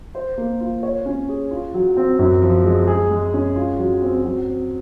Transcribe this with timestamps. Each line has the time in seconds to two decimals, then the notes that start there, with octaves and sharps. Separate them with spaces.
0.15 C5
0.38 A#3
0.61 F4
0.83 C#5
1.06 C#4
1.29 G#4
1.51 F4
1.74 F#3
1.97 C4
2.19 F#2
2.42 F3
2.65 G#3
2.87 G#4
3.11 G#3
3.34 C#4
3.56 F4
3.79 F#3
4.02 C4
4.24 F#3
4.47 C4